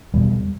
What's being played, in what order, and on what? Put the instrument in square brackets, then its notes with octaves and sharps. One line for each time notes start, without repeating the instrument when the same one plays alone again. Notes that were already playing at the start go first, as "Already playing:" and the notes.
[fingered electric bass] E2 B2 G3